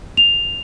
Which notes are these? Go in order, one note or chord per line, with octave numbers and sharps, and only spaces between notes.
F7